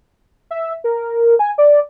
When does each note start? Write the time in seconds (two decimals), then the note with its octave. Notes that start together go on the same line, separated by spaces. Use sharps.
0.51 E5
0.84 A#4
1.39 G#5
1.58 D5